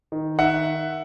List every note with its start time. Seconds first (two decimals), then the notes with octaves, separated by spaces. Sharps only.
0.12 D#3
0.39 D#3 E5 F#5